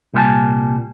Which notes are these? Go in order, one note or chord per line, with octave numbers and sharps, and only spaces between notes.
C2 A#2 G3 E4 G#5 A5